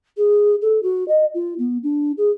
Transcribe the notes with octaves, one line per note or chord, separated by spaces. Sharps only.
G#4
A4
F#4
D#5
F4
B3
D4
G#4